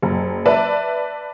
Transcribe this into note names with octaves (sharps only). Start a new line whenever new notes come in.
F#1
B4 D5 E5 A5